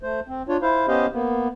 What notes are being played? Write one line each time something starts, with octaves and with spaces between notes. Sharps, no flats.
A3 C5
C4
D4 F4 C#5
E4 C5 F5
B3 C#4 G4 C5 D#5 F5
A#3 B3